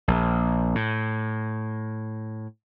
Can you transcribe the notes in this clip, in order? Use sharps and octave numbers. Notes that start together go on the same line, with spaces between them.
A#1
A2